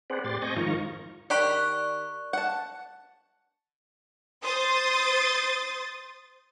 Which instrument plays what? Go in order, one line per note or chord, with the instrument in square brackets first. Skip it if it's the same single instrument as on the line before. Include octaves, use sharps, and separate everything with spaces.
[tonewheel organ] C4 G#4 B4 C5 D5 F#5
A2 G4 D5 C6 A6
C4 D#5 G#5 C#6 G6 A#6
G#2 D#3 F3 F4 A#5 C#6
[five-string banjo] D#3 G4 B5 [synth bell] D5 C#6 F#6
[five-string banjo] F#5 A5
[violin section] C5 D#6 A6